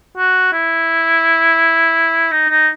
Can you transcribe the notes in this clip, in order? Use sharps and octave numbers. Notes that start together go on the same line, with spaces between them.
F#4
E4
D#4
D#4